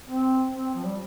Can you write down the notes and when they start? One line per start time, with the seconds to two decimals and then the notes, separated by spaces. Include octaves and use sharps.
0.08 C4
0.52 C4
0.75 F3
0.86 G3